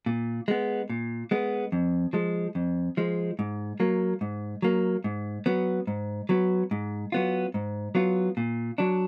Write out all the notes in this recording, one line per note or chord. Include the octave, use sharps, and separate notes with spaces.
A#2
G#3 B3
A#2
G#3 B3
F2
F3 G#3
F2
F3 G#3
G#2
F#3 A#3
G#2
F#3 A#3
G#2
F#3 B3
G#2
F#3 B3
G#2
F#3 B3 F4
G#2
F#3 B3 F4
A#2
F#3 D4